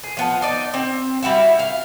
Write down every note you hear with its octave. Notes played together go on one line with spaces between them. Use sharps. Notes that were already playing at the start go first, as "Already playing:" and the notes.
G#4
F3 B3 A5
D#4 D5
C4
G3 E4 F#4 E5
F5